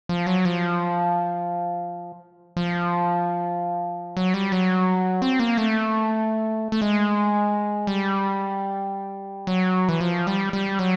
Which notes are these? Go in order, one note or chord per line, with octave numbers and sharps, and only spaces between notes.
F3
F#3
F3
F3
F#3
G3
F#3
C4
A#3
A3
A3
G#3
G3
F#3
E3
F3
G3
G3
F#3